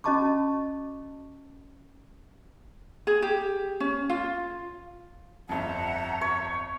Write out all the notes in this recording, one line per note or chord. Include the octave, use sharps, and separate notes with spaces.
C#4 F#4 D#5 A5 C#6 D6
G#4
G4
C#4
F4
G1 F2 E5 F#5 A5 A#5
C#5